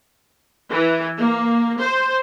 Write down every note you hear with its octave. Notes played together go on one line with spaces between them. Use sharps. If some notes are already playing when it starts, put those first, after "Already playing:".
E3
A#3
C5